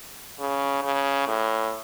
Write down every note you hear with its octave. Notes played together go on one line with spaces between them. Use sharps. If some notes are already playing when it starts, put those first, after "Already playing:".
C#3
C#3
A2